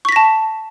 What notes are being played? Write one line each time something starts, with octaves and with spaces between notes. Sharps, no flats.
A5 C#6 A#6 B6